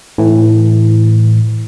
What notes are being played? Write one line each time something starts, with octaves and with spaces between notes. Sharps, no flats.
A2 E3